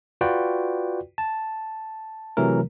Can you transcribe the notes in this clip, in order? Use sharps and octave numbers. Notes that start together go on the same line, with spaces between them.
F4 F#4 B4 D5 G5
A5
C3 E3 F#3 A3 A#4